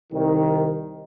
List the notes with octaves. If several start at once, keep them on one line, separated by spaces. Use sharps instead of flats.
C2 D#3